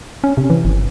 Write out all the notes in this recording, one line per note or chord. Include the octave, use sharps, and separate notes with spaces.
C#4
C3
E3
G1